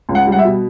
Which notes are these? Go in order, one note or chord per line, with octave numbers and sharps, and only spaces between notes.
C#2
F#5
G3
F#5
E5
B2